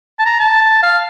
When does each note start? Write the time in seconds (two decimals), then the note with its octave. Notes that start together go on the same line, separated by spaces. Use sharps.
0.19 A5
0.25 A#5
0.39 A5
0.83 F5